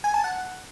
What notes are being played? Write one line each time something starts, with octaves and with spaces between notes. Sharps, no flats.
G#5
A5
F#5